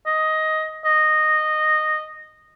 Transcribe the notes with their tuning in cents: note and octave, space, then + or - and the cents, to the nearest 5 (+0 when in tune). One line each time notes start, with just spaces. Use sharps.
D#5 +10
D#5 -10